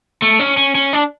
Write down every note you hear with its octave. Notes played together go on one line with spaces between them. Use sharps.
A3
C#4
C#4
C#4
D4